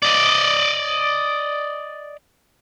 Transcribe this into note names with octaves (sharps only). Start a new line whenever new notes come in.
D5 D#5